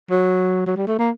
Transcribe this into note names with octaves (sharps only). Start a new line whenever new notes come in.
F#3
F#3
G3
A3
A#3